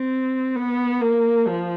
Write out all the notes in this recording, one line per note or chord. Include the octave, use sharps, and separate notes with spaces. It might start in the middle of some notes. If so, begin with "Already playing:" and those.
Already playing: C4
B3
A#3
F3